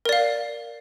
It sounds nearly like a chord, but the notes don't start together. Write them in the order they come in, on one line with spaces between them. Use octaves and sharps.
A#4 D5 F5